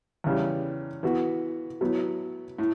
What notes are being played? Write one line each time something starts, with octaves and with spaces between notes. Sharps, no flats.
E2 C#3 G3
E3 B3 F#4
A2 F#3 B3
A2